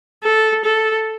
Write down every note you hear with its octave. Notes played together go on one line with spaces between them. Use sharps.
A4
A4